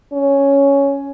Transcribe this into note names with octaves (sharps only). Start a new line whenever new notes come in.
C#4